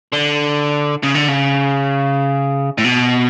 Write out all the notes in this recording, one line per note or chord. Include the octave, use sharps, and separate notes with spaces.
D3
C#3
D3
C#3
A2
B2